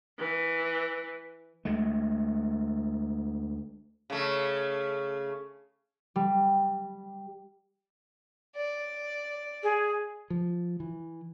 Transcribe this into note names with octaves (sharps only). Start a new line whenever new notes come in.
E3
D2 G#3 A3
C#3 A3
G3
D5
G#4
F3
E3